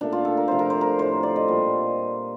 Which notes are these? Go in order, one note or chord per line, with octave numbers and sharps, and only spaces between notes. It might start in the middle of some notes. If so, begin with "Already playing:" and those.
A#2 A3 D4
F4
A4
A#4
C3 F3 A3 C5
A#4
C5
A#4
A2 A3 C5
D5
D#5
A#2 G3